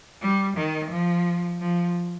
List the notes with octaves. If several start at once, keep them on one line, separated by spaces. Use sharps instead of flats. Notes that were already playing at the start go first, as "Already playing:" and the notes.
G3
D#3
F3
F3